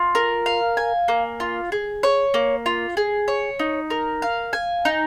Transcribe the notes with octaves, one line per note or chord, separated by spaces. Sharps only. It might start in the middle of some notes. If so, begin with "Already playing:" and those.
Already playing: F4
A#4
F5
G#5
A#3
F4
G#4
C#5
A#3
F4
G#4
C#5
D#4
A#4
F5
G#5
D#4